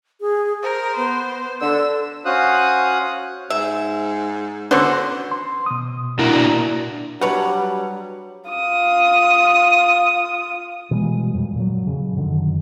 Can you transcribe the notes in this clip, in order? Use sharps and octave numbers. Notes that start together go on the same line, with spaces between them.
G#4
A#4 C5
B3 C5
D3 E6
C#4 F#4 C5 F5 D#6 F#6
G#2 E5
D3 B3 C#4 F#4 C5 C6
C6
B2 D#6
A#2 D4 E4 F#4 A#4
F#3 G3 D4 B4 C#5 F#5
F4 D#6
B2 E3 G3 G#3
F2 A#2
A#2 F#3
F2 C#3
F#2 D3 D#3 F#3